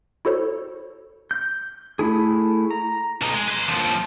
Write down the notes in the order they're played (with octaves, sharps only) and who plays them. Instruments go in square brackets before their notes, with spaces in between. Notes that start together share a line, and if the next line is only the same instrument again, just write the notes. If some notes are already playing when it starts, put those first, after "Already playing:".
[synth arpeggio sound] E4 F#4 A4 C5 C#5
[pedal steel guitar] G6
A3 E4 G#4
A#5
[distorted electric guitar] B1 D#4
G#3
B4 C6
D#2 F3